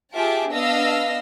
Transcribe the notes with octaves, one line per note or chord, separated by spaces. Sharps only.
F4 G4 G#4 E5 A5 D6
B3 D4 D#5 F5 E6 A#6